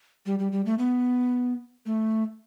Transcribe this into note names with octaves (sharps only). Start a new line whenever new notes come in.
G3
G3
G3
A3
B3
A3